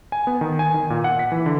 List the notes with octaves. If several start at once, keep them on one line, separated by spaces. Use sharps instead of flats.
G#5
B3
D#3
G#5
D#3
A#2
F#5
B6
E3
D3